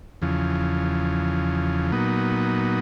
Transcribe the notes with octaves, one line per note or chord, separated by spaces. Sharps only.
E2 C#3 F3
A#2 F#3 B3 D#4